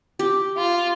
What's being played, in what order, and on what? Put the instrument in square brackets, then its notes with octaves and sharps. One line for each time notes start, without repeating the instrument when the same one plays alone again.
[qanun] G4
[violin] F4